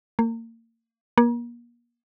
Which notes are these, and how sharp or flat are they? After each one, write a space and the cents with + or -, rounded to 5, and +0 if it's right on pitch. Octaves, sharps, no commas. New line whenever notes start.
A#3 -30
A#3 +35